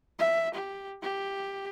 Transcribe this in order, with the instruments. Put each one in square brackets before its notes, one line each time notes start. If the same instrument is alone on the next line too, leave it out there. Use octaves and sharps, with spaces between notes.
[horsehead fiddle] E5
G4
G4